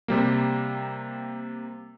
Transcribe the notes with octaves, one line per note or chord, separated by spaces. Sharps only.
C3 G3 A#3